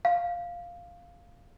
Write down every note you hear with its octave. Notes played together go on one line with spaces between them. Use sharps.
F5